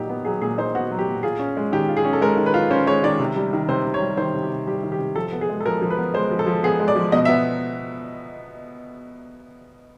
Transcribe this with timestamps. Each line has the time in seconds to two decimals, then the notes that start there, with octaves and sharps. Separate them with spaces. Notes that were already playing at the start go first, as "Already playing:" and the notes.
Already playing: A#2 F#3 D#4 G4
0.09 B3
0.25 F#3 G#4
0.41 A#2 G#4
0.58 D#4 C5
0.75 B3 F#4
0.91 F#3
0.99 G4
1.07 A#2
1.23 F4 G#4
1.39 C#4
1.57 G#3
1.72 D#3 G4
1.89 F4
1.97 G#4
2.05 C#4
2.13 A4
2.21 G#3 A#4
2.37 D#3
2.46 B4
2.54 F4
2.71 C#4 C5
2.87 G#3 C#5
3.03 D#3 D5
3.19 C3
3.36 G3
3.53 D#3
3.68 C3 C5
3.85 C3
3.94 C#5
4.02 G3
4.17 D#3 C5
4.34 C3
4.43 G4
4.51 C3
4.67 G3 G4
4.83 D#3
4.92 G4
4.99 C3
5.16 F3 A4
5.32 B3
5.41 G#4
5.49 G#3
5.61 A4
5.66 F3 A#4
5.82 F3
5.90 B4
5.98 B3
6.14 G#3 C5
6.31 F3
6.39 A4
6.47 F3
6.64 B3 G#4
6.80 G#3
6.88 D5
6.96 F3
7.12 B2 D#5
7.25 E5
7.28 B3